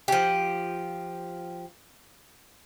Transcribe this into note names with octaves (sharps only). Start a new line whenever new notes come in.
F3 G4